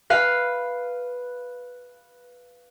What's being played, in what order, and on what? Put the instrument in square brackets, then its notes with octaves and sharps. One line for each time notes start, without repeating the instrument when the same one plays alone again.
[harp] B4 F5